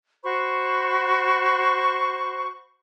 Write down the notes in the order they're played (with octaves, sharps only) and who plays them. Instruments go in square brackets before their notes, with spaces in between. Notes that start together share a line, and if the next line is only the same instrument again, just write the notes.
[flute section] F#4 C5 B5 C#6